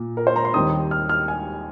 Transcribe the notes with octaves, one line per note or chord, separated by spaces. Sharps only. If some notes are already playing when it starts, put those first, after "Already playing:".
Already playing: A#2
A#4
C5
A#5
C6
D#2 D#3 G3 C4 D#6
F6
F6
G#5